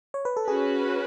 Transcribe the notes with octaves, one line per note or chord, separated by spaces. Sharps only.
C#5
B4
A4
C#4 F#4 G#4 B4